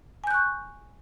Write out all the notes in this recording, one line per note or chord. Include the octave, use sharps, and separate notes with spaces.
G#5 C#6 F#6 G6